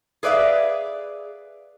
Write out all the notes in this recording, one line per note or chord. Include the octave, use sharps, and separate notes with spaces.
G#4 B4 D5 E5 F5